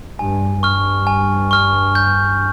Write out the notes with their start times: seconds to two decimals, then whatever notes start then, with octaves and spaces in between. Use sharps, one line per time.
0.19 G2 G#5
0.63 G2 C#6 F6
1.07 G#5
1.51 C#6 F6
1.95 G6